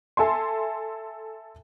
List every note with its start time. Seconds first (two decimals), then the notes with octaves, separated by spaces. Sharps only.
0.17 A4 E5 G#5 C6